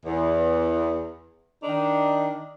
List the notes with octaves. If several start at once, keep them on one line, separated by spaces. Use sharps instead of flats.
E2
D#3 D4 D#4